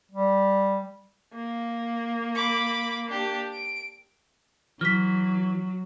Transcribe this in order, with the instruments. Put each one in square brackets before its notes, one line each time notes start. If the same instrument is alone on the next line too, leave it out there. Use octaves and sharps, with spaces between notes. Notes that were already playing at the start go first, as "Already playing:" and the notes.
[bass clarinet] G3
[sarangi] A#3
[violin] B5 D6
D4 G4
D7
[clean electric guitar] E3 [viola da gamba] F#3 [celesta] F6 B6